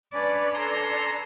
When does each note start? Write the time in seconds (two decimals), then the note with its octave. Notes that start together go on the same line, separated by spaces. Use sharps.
0.13 C#4 D4 B4 D5
0.55 A4 B4 A#5 C6